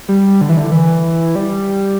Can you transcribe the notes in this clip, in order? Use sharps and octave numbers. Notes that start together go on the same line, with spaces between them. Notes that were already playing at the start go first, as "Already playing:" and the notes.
G3
D3
E3
D3
E3
G3